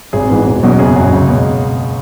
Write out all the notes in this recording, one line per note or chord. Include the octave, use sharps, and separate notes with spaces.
G#1 G#4
G#2 E3 G#3 B3
E1
E2 B2 F#3 C#4
F#1 G#4
F#2 F#3
C#2
B2